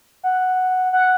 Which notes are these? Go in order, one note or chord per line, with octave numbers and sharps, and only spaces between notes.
F#5
F#5